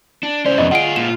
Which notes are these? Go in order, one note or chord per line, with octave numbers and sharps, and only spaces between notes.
D4
C2 C#4 C5 D5
F2 B3 D#5
D2 F4 G#4 F#5 D7
A#2 G#3 E7